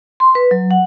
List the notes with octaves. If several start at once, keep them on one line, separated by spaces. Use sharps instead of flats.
C6
B4
F#3
F#5